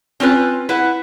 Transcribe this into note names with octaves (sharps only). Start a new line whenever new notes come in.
C4 C#4 F4 B4
E4 B4 F#5